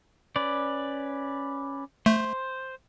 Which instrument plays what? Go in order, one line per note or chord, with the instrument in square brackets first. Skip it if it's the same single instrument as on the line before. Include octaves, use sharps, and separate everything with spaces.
[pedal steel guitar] C#4 B4 D5
[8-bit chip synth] A3 [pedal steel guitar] C5